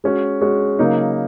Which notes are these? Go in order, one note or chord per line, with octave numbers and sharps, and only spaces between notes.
G#3 C#4 F#4
G#3 C#4 F#4
C#3 F#3 A#3 D#4